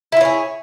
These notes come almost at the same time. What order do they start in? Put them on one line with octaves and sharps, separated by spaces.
E4 F4 C#5 G#4